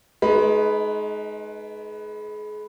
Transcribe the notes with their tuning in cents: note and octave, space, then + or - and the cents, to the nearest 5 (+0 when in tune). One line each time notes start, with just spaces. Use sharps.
G#3 +35 D#4 +0 B4 +0